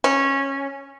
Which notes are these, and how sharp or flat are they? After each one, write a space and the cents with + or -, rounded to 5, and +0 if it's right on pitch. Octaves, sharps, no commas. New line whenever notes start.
C#4 -15